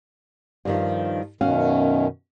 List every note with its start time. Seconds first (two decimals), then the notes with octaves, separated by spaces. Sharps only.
0.65 G2 D#3 F3
1.41 F#2 B2 D#3 C#4 F#4 F5